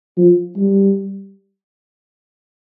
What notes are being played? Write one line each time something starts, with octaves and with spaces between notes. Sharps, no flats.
F3
G3